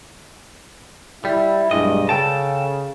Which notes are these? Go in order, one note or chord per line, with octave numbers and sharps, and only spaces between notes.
G3 E4
B1 G2 G#3 D#5
C#3 A4 G5 A5